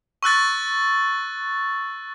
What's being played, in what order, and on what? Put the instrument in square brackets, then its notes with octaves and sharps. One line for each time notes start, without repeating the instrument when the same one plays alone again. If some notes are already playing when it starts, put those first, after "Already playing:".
[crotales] C#6 E6 F#6 A6